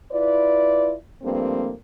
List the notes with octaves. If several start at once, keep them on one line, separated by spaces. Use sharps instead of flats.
E4 F4 B4 D5
G2 F3 A3 A#3 C4